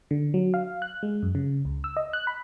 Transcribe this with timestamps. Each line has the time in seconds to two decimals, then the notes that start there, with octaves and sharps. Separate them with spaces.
0.11 D3
0.34 F#3
0.54 F5
0.82 F#6
1.03 G#3
1.23 F#2
1.35 C#3
1.65 C#2
1.84 E6
1.97 D#5
2.13 F#6
2.27 B5